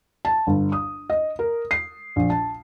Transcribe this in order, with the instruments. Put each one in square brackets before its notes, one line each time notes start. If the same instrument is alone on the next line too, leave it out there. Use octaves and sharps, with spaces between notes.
[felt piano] A5
G1
D#6
D#5
A#4
C7
A#1
A5